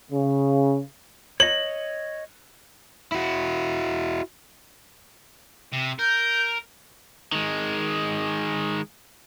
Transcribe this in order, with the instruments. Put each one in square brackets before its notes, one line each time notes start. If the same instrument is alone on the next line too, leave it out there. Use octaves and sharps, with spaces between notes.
[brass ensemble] C#3
[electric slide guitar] C#5 D#5 [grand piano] F#7
[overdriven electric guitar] E4 F#4
[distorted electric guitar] C3
[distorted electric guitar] A#4 [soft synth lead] G6
[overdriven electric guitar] D#3 G#3